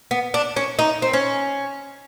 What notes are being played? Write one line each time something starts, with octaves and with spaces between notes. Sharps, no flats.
B3
D4
C#4
D#4
C4
C#4